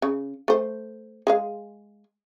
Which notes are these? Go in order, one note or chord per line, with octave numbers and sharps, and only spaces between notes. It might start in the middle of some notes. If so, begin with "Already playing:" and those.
C#3
A3 C5
G#3 G#4 F5